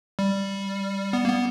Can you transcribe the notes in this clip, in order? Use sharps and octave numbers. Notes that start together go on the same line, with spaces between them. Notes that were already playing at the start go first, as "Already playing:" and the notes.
G3
B3
A#3
B3